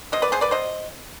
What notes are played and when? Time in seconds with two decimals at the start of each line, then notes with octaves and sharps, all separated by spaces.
0.12 B2 C5 D#5
0.22 B4 D5
0.32 B3 G#4 C5
0.41 B4 D5
0.51 B2 C5 D#5